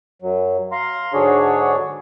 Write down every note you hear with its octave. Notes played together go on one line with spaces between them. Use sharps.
F#2 F#3
F5 A#5 C6
G#2 D3 F#3 D4 G#4 C#5